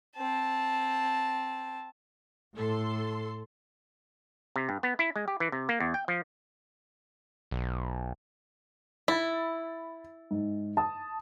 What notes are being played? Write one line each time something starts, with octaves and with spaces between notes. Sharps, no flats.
C4 A5
A2 A4 C6
C3
G2
B3
E4
G#3
G4
E3
C3
A#3
E2
G5
F3
B1
E4 B5 A6
G#2
A5 D#6